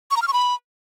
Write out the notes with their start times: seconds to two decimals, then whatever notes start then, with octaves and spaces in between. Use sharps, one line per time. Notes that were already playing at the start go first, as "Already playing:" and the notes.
0.11 C#6
0.17 A#5
0.22 F6
0.28 C#6
0.33 B5